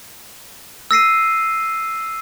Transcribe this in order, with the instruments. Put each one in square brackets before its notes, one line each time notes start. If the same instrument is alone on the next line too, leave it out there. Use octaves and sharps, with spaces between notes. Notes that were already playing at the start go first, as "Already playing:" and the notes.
[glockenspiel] E6 A#6 C7 D#7